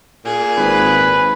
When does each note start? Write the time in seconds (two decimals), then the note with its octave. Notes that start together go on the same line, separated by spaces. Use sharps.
0.25 A#2 G#4
0.57 G#1 B4